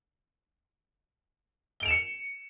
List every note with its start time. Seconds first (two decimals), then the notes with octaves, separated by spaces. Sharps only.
1.80 G7
1.83 D7
1.85 F7
1.88 E7
1.91 C#7